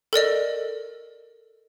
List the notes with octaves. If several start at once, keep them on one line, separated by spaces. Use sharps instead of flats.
A4 A#4 D5 D#5